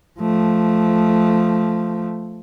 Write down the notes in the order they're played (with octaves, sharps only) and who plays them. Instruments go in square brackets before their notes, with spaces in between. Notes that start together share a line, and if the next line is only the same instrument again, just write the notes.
[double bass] F3 A3